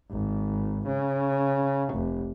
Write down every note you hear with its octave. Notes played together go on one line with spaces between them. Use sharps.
G#1
C#3
F1